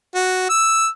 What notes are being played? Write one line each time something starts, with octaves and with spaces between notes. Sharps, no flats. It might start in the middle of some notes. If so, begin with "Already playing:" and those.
F#4
E6